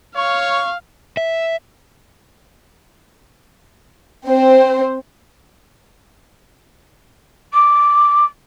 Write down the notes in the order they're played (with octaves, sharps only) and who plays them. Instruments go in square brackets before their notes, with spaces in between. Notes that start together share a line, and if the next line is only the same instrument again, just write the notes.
[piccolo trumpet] C#5 [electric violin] F5 [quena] C#6
[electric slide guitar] E5
[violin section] C4 C5
[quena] D6